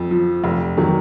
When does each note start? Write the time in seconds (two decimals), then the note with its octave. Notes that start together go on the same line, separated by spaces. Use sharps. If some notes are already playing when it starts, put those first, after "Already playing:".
Already playing: F2 F3
0.11 F3
0.44 F1
0.77 D#3 F#3